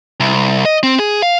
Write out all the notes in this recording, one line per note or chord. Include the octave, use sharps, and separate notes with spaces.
C2
D#5
C4
G#4
F5